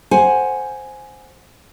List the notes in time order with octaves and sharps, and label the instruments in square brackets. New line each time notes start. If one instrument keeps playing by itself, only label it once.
[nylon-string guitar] C5 F#5 G#5